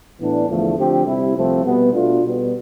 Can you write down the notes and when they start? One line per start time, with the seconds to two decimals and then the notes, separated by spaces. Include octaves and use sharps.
0.19 A2 E3 B3 D4
0.48 E2 D3 F3 A3
0.77 D3 F3 A3 C4 G4
1.06 C3 G3 C4 E4
1.35 C2 C3 F3 A3 C4
1.64 B2 G3 B3
1.93 B2 A3 D4 F4
2.22 B2 G3 B3